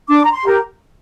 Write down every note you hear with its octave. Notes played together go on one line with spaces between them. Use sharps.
D4 D6
A#5
C6
G4 A#4